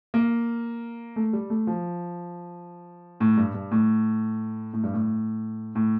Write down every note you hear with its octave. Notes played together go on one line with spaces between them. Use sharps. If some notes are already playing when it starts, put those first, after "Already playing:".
A#3
A3
G3
A3
F3
A2
G2
G2
A2
A2
G2
A2
A2